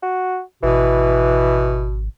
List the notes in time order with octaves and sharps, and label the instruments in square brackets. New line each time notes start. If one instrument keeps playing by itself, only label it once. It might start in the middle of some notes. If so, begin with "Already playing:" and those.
[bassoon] F#4
[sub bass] G#1 [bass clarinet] B2 [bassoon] E3